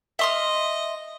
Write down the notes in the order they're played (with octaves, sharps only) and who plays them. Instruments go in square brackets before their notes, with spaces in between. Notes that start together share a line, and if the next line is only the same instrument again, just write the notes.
[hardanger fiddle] D#5 [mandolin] E5 C6 F6